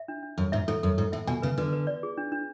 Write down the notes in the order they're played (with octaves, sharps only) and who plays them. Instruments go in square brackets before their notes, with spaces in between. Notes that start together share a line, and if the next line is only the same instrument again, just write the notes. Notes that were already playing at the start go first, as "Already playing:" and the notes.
Already playing: [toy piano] E5
D4
D4
[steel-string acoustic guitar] F#2 [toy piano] A4
[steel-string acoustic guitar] G#2 [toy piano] E5
[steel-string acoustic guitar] G#2 [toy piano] A4
[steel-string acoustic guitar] F#2 [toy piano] A4
[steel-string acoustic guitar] G#2 [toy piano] A4
[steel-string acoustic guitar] A2 [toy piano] E5
[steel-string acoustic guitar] B2 [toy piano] G#5
[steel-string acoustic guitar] C#3 [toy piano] B4
[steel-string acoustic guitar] D3 [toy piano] B4
[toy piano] B4
D5
G#4
D4
D4